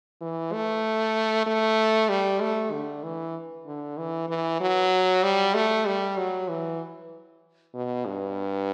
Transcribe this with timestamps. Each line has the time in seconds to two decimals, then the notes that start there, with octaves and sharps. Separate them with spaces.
0.21 E3
0.52 A3
1.47 A3
2.09 G3
2.41 A3
2.72 D3
3.03 E3
3.67 D3
3.98 E3
4.29 E3
4.60 F#3
5.23 G3
5.54 A3
5.86 G3
6.18 F#3
6.49 E3
7.74 B2
8.06 G2